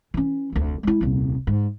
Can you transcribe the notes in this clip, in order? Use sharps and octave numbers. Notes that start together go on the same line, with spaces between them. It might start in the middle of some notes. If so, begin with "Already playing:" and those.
E3 C#4
F1 D2
G#3 E4
D#1 C2
G#2